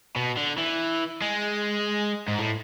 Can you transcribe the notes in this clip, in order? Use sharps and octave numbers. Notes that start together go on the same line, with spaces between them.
B2
D3
E3
G#3
G#2
A2